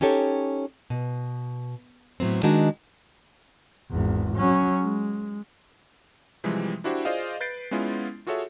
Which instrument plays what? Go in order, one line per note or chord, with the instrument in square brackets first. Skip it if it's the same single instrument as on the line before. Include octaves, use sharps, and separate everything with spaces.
[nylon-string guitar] C#4 D#4 G4 A4 C#5
B2
A2 F#3 B3 C4
D#3 G#3 D4 D#4 F#4
[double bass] G#1 E2
F#3 C#4
G#3
[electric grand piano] C3 E3 F3 G3 G#3
D4 E4 F#4 G4 C5
F4 G#4 C5 D5 D#5 F5
B4 G6 A6 C7 D7
G#3 B3 C#4 E4 F4
F4 F#4 G#4 A4 C#5 E5